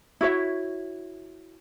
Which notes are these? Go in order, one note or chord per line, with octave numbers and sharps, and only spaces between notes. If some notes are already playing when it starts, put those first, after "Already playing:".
E4 F#4 C#5 E5